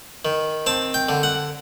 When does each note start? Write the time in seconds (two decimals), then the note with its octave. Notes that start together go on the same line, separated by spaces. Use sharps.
0.25 D#3
0.66 C4 A5
0.94 G5
1.09 D3
1.23 F#5